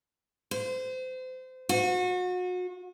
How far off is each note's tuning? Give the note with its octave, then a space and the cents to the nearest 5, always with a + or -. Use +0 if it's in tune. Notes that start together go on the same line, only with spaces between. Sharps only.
C5 -30
F#4 -35